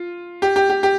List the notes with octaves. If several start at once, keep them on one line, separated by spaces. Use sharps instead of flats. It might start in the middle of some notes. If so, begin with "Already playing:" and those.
Already playing: F4
G4
G4
G4
G4